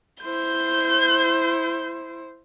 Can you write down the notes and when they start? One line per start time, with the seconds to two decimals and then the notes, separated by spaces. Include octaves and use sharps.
0.24 E4 C5 G6